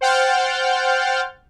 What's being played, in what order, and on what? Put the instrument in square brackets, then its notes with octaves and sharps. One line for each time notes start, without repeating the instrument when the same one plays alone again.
[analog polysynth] C5 F#5 G5 F6 G6 A6